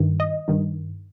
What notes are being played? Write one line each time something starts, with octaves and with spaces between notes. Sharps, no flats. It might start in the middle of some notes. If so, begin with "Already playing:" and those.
Already playing: G2 D#3
D#5
G2 D#3